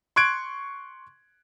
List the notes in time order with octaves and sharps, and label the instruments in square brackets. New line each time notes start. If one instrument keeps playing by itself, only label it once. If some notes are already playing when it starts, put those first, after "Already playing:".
[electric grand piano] C6 C#6 F#6 G#6 D7